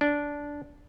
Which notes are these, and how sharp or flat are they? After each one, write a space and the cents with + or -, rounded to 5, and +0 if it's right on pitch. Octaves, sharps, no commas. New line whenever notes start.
D4 -10